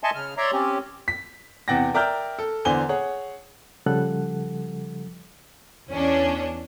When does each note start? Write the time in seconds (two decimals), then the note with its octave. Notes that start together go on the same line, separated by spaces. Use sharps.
0.03 D#5 E5 G#5 A5 C6 C#6
0.15 C#3 F6
0.37 C#5 D5 E5 A#5 C6
0.53 C4 C#4 G4
1.08 B6
1.68 E2 C3 F#5 G5 A6 A#6
1.94 A#4 D5 E5 G5 F6 G6
2.39 A4
2.65 E2 D3 C5 G#5 G7
2.89 G#4 C#5 F#5
3.86 C#3 F3 G3 A4 F#5 F#6
5.91 E2 C#4 D4